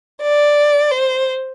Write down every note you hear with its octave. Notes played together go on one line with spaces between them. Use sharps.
D5
C5